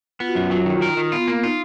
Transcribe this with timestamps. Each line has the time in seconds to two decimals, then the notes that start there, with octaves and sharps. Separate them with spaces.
0.20 B3 F4
0.28 F#4
0.35 F#2 F4
0.51 F#3 F4
0.66 D#3
0.82 F4 A#4
0.97 D#3
1.12 B3 F4
1.28 A#3 B3
1.43 D#4 F4